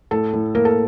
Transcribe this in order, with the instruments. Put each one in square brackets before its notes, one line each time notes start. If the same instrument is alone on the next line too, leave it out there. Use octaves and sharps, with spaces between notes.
[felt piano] A2 A4
A2
A#3 A#4
A4